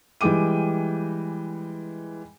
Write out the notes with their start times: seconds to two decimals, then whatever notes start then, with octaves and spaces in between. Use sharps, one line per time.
0.21 E3 G3 G#3 G5 D6 D#7